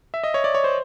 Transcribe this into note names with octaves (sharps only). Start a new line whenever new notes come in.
E5
D#5
C#5
D5
C#5
C5